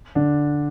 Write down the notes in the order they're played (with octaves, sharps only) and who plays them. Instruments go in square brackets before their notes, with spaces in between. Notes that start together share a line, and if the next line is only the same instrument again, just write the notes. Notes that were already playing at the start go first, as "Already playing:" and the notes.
[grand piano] D3 D4